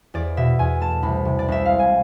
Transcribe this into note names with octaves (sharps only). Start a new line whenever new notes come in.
E2 D5
B2 E5
E2 G#5
A3 A5
C2 B5
C3
D5
C2 E5
F5
G#3
G#5